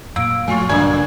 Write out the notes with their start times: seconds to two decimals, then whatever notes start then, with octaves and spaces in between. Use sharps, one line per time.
0.16 F#2 A#2 A#3 E6 D7
0.48 A#2 F3 A3 F4 G#5 C#6
0.69 A#1 G2 C#3 F#3 A#3 D5 E5 G#5